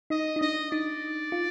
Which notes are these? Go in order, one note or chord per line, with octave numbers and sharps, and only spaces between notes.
D#4 D#5
D#4
D4 D#5
D#4 D5
F4